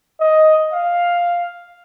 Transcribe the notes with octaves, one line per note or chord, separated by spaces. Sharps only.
D#5
F5